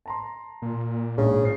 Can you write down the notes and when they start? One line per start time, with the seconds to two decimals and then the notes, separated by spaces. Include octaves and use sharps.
0.06 A5 A#5 C6
0.62 A#2
1.17 A#1 G#2 C#3
1.42 A#2 C5 C7